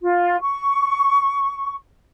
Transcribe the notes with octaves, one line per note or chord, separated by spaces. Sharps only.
F4
C#6